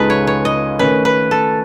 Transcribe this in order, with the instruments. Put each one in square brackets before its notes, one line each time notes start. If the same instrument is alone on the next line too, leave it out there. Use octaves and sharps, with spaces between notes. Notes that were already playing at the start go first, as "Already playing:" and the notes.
Already playing: [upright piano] C#2 C#3 G#3 D#4 G#4 [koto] A4 B4
[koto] C#5
C#5
D#5
[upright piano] D#3 A3 C#4 [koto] B4
[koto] B4
A4